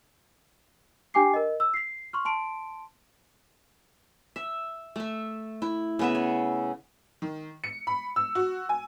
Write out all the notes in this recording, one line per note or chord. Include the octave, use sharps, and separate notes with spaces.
D4 G4 G5 G#5 D6 C7
A#4 D#5
E6
B6 C7
C6 C#6 F6
A5 C6 D7
E5
A3 E5
E4
C#3 B3 E5
C#5
D#3
C#7
B5
E6
F#4
G#5